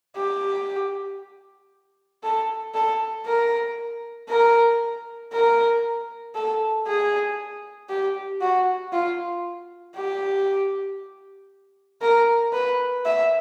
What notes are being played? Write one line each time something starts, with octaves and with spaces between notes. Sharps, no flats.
G4
A4
A4
A#4
A#4
A#4
A4
G#4
G4
F#4
F4
G4
A#4
B4
E5